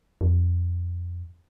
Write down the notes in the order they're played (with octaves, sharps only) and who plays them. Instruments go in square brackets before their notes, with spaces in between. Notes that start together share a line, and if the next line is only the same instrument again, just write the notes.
[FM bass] F2